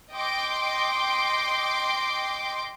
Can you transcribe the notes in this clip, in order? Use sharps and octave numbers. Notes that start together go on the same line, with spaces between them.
D#5 G5 C6 D6